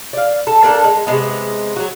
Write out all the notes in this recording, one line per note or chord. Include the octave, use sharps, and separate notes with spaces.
D5 F5
A4
A#3 D4 A4 A#4
G#3
C3 G#3 B3
F#3 F#4